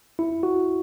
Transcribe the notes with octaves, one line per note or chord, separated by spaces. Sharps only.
E4
F#4